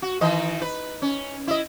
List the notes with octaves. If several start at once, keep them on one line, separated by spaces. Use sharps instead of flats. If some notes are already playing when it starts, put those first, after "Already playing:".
F#4
D#3 E3 D#5
B4
C#4
E4 D#5